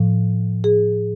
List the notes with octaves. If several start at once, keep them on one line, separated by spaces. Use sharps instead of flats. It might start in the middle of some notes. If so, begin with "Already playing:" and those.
Already playing: A2 F3
G#4